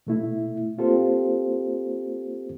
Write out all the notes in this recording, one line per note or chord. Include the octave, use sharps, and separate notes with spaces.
B2 A3 E4
A#3 C4 F4 G4 A4 C5